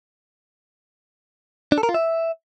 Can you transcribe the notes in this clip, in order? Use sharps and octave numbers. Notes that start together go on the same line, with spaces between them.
D4
A4
A#4
F4
E5